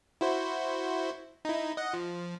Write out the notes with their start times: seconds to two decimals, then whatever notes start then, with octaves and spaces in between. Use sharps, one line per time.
0.21 E4 F#4 C5
1.45 D#4 E4
1.77 D#5 F#5
1.93 F3